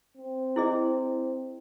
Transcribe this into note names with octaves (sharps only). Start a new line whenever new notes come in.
C4
E4 G#4 D#5